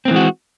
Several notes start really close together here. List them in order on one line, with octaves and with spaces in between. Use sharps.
C4 A#3 E3 G#3 F#4